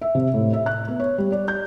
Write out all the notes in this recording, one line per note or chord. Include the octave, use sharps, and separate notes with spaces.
E5
C3
A2
E5
F#6
B3
C#5
G3
D5
G6